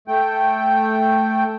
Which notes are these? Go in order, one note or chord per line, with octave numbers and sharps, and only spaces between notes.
A3 G5